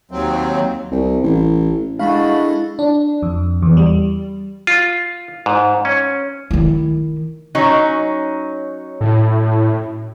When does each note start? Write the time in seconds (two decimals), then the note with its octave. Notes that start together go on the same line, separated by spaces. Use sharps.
0.11 D#2 F#3 C4
0.91 C2
1.23 A1
1.99 G#3 A3 D4 E4 F#4 A4 F5 B5
2.79 D4
3.23 F2
3.62 E2
3.77 G3
4.67 F4
5.46 G#2
5.85 C#4
6.51 D#3 E4
7.55 F#3 C#4 D#4
9.01 A2